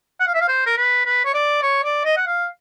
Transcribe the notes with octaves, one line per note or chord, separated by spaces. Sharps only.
F#5
F5
E5
F5
C5
A#4
B4
B4
C#5
D5
C#5
D5
D#5
F#5
F5